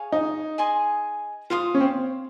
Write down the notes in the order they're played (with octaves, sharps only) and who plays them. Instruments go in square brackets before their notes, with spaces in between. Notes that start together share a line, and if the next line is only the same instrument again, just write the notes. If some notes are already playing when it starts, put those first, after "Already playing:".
Already playing: [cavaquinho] G#4 C#5 F5 G#5
[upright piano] D#4
[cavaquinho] G#4 D#5 G#5 C6
[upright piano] F4 [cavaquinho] C5 F5 C6 D#6
[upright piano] C#4
C4